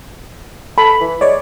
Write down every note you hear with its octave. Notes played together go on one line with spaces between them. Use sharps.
A4 B5
E3
G#3 C#5 D5